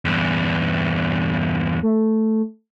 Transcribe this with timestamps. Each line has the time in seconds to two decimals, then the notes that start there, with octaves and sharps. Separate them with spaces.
0.05 E2 G2
1.83 A3